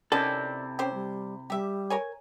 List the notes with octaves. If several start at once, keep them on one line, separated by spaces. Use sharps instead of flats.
C3 D#3 C4 C#4 E4 A4 D5
C#4 G4 C5
G3
G3 G4 E5
A#4 C#5 G#5